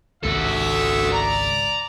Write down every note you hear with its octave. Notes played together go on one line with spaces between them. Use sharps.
G#1 C#2 C3 F#4 A4 E5
D5 A#5